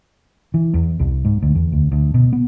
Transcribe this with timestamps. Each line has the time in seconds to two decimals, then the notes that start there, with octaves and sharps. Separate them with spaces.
0.54 E3
0.74 E2
1.00 C2
1.25 G#2
1.42 D2
1.55 E2
1.72 D2
1.92 D2
2.14 B2
2.33 B3